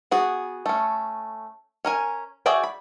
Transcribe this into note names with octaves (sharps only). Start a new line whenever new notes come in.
B3 F#4 G#4
A3 C#4
C#4 A#4 G#5
F#4 G#4 D5 E5 G5
B5